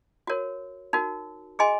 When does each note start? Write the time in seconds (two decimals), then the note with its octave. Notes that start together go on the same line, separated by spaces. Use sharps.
0.27 F#4 A#4 C#5
0.93 D#4 F#4 A#4
1.59 G#4 D#5 G#5 C6